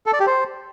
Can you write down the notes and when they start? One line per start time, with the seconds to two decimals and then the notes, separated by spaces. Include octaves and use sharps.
0.06 A4
0.13 D5
0.20 G4
0.27 C5